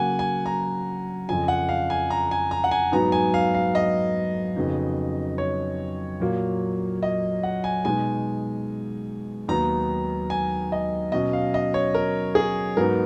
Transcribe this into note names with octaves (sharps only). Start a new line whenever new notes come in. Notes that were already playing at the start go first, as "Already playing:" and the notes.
Already playing: C#3 F#3 A#3 F#5 G#5
G#5
A#5
F2 C#3 F3 G#5
F#5
F5
G#5
A#5
G#5
A#5
F#5
G#5
G#2 F#3 B3 D#4 A#5
G#5
F5
F5
D#5
F2 C#3 F#3 B3 D#4
C#5
A#2 F#3 A#3
D#5
F#5
G#5
B2 G#3 D#4 G#5
D#2 D#3 F#3 B3 D#4 A#5
G#5
D#5
B2 F#3 C#4 D#5
F5
D#5
C#5
A#4
G#4
G#2 F#3 B3 D#4 A#4